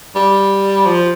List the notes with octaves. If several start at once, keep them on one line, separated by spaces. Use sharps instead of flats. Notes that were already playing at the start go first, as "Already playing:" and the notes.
G3
F3